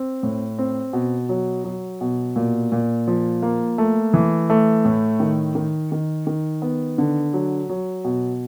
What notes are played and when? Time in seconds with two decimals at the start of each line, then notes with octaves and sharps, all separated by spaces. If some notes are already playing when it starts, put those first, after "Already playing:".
Already playing: C4
0.23 A2
0.58 C4
0.93 B2
1.29 F#3
1.64 F#3
2.01 B2
2.36 A#2
2.72 A#2
3.07 F3
3.42 A#3
3.78 A3
4.14 E3
4.50 A3
4.85 A2
5.20 D#3
5.55 D#3
5.92 D#3
6.27 D#3
6.62 B3
6.98 D3
7.33 F#3
7.69 F#3
8.04 B2